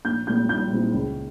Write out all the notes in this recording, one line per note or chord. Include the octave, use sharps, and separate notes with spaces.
A#1 G6
A#2 G#3 C4 E4 G6
A#1 G6
A#2 G#3 C4 E4
C#2